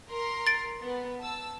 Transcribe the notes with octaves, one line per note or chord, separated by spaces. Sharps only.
A#4 A#5 C6
A6 D7
B3
A5 E6